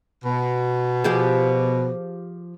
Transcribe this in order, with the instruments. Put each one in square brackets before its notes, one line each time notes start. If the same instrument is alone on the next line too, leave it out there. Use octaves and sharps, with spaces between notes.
[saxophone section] B2
[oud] F3 G4 G#4